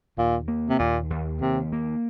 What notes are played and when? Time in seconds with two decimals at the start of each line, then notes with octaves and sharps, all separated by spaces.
0.18 D#2 A#2
0.48 A#3
0.69 C3
0.79 D#2 A#2
1.10 D#2
1.41 D#2 C3
1.72 A#3